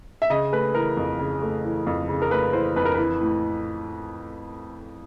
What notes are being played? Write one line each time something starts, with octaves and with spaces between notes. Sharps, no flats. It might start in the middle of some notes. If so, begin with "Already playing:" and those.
E5
C#3 D#5
A3 B4
E3 A#4
F2
C#3
A3
E3
F2
C#3
A#4
A3 B4
E3 C5
F2 B4
A#4
E3 B4
A2